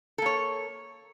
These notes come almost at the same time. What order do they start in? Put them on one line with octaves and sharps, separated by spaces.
A4 A#3 C#5